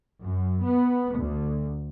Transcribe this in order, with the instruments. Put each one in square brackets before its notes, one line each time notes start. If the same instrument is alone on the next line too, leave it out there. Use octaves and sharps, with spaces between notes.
[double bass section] F#2
B3
D2